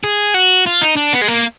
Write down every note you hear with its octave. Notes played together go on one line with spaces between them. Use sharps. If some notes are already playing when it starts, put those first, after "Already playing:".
G#4
F#4
F4
D#4
D4
B3
G#3
A#3